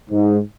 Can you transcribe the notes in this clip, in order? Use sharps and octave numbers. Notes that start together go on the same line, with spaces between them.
G#2